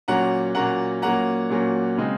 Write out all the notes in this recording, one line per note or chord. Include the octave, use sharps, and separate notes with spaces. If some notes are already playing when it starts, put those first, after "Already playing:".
A#2 F#3 A#3 C#4 F#5 A#5
A#2 F#3 A#3 C#4 F#5 A#5
A#2 F#3 A#3 C#4 F#5 A#5
A#2 F#3 A#3 C#4
C#3 G#3 C4 D#4